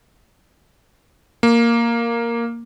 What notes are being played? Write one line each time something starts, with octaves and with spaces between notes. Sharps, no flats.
A#3